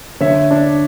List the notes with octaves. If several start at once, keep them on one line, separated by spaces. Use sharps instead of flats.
D3 C#5 E5
D4